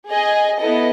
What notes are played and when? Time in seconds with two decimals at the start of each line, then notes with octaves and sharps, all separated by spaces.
0.10 G#4 D#5 G#5
0.59 B3 E4 A4 D#5